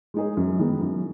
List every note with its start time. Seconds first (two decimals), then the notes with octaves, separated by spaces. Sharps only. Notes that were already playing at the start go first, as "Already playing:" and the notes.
0.14 G#3 D#4 G#4
0.37 F#2
0.59 D#3 G#3 B3 G#4
0.81 F#2